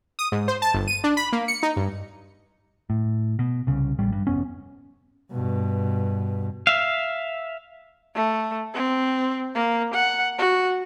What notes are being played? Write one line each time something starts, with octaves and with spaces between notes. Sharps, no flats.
D#6
G#2
C5
A5
G1
D#7
D4
B5
A#3
C#7
D#4
G2
A2
B2
C2 C#3
A1 G3
G2
F1 B3 C#4
G2 B2
E5 F5
A3
C4
A#3
F#5
F#4